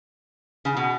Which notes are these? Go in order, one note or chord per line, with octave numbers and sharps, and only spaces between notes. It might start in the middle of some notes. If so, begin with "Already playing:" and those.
C#3
B2